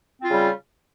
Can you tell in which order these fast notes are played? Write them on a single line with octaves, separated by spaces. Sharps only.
C4 F4 C#3 G3